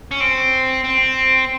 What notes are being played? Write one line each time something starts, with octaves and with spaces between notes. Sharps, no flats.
C#4
C4
C4